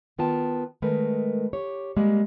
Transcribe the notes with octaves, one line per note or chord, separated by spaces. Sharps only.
D#3 B3 F4 G5 A5
D#3 G#3 A3 A#4 B4
G4 C#5
G3 G#3 A#3